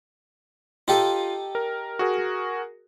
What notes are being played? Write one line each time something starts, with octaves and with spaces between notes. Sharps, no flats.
D#4 F4 G4 A4
A#4
F#4 G#4 A#4